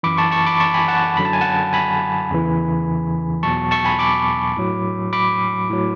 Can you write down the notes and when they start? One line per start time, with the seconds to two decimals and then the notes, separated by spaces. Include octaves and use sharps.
0.03 F#2 E3 B5 D6
0.17 A5 C#6
0.31 A5 C#6
0.46 B5 D6
0.60 A5 C#6
0.74 G#5 B5
0.88 F#5 A5
1.17 F#2 D3 F#3 B5
1.25 A5
1.33 G#5
1.41 F#5 A5
1.73 G#5 B5
2.31 E2 C#3 E3
3.43 E2 B2 F#3 A5 C#6
3.71 A5 C#6
3.85 G#5 B5
3.99 B5 D6
4.57 A2 F#3
5.13 B5 D6
5.70 A2 F#3